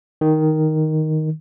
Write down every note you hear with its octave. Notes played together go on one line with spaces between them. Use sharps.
D#3